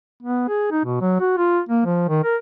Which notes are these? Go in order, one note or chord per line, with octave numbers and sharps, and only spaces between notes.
B3
G#4
D#4
B2
F#3
F#4
F4
A#3
F3
D#3
A#4